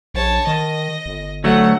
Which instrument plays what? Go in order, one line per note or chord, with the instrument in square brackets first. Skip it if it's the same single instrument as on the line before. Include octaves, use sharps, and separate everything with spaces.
[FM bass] A#1 [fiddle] C#5 A5
[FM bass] D#3 [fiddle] D#5
[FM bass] G1
[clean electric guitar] D2 F#3 A3 [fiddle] F#5